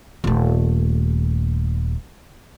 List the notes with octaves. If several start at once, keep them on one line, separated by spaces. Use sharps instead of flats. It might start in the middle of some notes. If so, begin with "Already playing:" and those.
D#1 A3